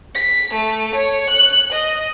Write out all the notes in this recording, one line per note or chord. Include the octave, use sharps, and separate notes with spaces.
B6
A3
C#5
F#6
D#5